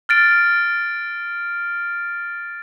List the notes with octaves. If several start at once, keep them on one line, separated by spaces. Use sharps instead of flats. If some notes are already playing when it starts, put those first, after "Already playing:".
F6 A6 D7